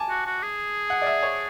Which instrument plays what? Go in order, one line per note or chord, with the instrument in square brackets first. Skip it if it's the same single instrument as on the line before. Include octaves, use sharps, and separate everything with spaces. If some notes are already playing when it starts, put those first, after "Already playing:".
Already playing: [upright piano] G#5 A5 D6
[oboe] F#4
F#4
G#4
[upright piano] F#5
D5
E5
C#5